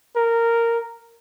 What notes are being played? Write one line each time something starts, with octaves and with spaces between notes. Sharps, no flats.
A#4